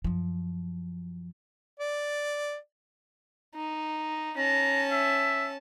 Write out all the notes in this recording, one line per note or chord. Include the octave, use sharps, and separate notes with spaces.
F#2 F3
D5
D#4
C#4 A5 A#5
E5